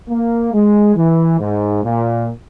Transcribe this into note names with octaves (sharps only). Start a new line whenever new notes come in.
A#3
G#3
E3
G#2
A#2